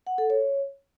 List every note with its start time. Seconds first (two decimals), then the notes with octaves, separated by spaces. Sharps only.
0.07 F#5
0.18 A4
0.30 C#5